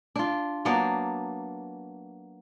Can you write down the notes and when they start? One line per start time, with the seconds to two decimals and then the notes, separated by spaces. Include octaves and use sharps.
0.16 D4 F4
0.65 F#3 A#3 B3 D4